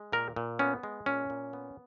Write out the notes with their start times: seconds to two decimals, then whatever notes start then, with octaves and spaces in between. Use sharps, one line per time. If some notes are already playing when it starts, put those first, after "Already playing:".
Already playing: G#3
0.12 A#2 A#4
0.36 A#2
0.59 B3 C#4
0.83 G#3
1.06 A#2 C#4
1.30 A#2
1.53 B3